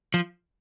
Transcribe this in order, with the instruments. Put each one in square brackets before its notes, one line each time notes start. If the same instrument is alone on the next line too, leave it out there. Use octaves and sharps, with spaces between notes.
[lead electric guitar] F3